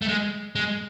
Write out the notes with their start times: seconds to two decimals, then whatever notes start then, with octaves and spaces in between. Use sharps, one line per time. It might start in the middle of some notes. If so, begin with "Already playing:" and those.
0.02 A3
0.08 G#3
0.55 G#3